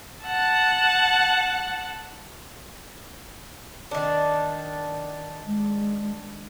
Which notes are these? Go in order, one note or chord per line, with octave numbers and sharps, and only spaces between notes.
F#5 A5
D#3 D4
G#3